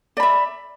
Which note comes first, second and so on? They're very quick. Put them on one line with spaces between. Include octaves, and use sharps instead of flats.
D5 B5 E5